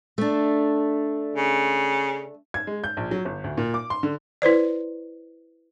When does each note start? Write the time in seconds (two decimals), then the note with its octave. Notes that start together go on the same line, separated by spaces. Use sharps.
0.18 A3 D4
1.36 C#3
2.54 G#6
2.67 G#3
2.84 G6
2.97 A#1
3.11 F#3
3.25 G1
3.44 D2
3.58 A#2
3.74 D6
3.90 C6
4.03 D3
4.42 E4 B4 C5 D5